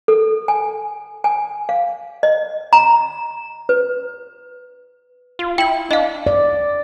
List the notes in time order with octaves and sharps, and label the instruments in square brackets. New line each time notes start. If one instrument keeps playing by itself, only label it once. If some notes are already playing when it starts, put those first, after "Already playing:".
[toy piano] A4
G#5
G#5
F5
D#5
A#5
B4
[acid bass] F4
[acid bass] E4 [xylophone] G5 F#7
[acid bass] D4 [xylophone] D#5 F5
[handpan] D5